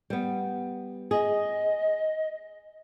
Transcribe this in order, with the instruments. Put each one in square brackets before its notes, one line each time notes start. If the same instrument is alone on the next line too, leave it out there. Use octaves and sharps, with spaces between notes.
[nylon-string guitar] G3 B3
[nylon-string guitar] G#4 [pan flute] D#5